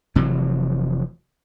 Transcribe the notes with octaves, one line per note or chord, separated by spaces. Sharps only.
F1 C3 E3 F#3